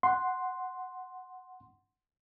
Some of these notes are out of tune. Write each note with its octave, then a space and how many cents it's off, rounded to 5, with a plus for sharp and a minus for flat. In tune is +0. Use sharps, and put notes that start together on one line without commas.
F#5 +0 C6 +0